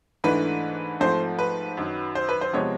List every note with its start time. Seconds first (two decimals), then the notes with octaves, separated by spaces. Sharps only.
0.24 G#2 E3 A3 D4 B4
1.00 G#2 F3 A3 C4 C5
1.39 B4
1.77 F#2 D#3 F#3
2.15 C5
2.29 B4
2.41 C5
2.53 C3 F3 G#3 B3 C#5